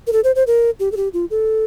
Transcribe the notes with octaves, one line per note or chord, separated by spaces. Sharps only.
A#4
A4
C5
C5
A#4
G4
A4
G4
F4
A4